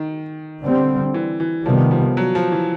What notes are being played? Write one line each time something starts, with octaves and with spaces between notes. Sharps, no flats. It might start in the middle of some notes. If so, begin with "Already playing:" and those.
Already playing: D#3
D3 G3 C4
E3
E3
C3 D#3 F3 G3 B3
F3
F#3
F3
E3